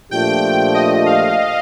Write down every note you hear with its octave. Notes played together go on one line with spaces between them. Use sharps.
A#2 F3 A3 D4 G4 G5
D#5
F5